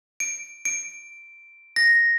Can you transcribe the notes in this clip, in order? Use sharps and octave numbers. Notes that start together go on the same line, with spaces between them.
D7
D7
A#6